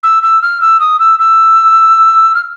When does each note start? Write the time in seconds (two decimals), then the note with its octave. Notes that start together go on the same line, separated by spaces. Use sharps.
0.03 E6
0.23 E6
0.42 F6
0.61 E6
0.80 D#6
0.99 E6
1.19 E6
2.35 F6